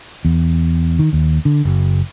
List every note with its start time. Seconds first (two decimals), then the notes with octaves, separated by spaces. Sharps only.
0.25 E2
0.99 D#3
1.13 D#2
1.45 D3
1.65 F#1